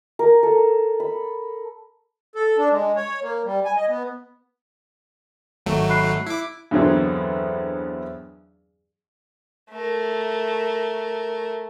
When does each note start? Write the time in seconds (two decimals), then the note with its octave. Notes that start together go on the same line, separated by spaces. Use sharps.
0.19 A#4
0.43 A4
1.00 B5
2.35 A4
2.58 D4
2.72 G#3
2.96 C#5
3.22 A#3
3.45 G3
3.65 G#5
3.76 D#5
3.88 B3
5.66 G#1 F#3 A3
5.89 B5 F#6 C7
6.26 E4 D6
6.71 E2 G2 D3 F#3 B3 C4
9.72 A3 A#4